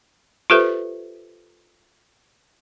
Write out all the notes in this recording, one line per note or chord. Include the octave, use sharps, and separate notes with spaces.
F4 G4 A4 B4 C5 E5